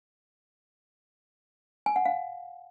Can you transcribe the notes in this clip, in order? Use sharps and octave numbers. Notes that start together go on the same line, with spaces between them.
G#5
F#5
F5